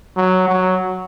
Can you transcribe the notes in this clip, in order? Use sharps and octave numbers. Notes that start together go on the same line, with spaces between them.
F#3
F#3